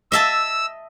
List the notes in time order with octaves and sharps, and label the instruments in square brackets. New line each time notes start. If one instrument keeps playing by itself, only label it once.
[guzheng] D#5 E5 A5 [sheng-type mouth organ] E6